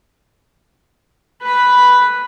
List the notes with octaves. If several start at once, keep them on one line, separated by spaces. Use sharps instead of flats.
B4 B5